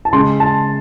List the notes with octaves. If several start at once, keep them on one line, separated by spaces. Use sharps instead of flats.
A5
C#3 G#3 C6
A5